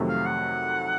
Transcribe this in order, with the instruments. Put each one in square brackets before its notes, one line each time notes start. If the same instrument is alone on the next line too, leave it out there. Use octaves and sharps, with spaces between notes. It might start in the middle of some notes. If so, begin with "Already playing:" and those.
Already playing: [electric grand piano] F2 C3 D#3 F#3 A3
[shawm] F5
F#5